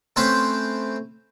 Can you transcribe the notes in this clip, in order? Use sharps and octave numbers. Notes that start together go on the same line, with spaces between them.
A3 C4 C#4 B4 C5 A5